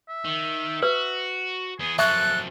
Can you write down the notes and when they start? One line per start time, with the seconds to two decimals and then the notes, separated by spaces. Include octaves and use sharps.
0.09 E5
0.24 D#3
0.83 F#4 B4
1.80 E2 B3 G#4
1.99 F#2 F3 A4 E5 C#6 F#6